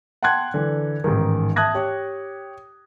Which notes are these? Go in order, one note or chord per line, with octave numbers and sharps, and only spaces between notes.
F#5 G5 A5 C6 F#6 G#6
D3 E3
A1 G#2 D#3
E5 A5 D#6 F#6 G#6 A#6
G4 C#5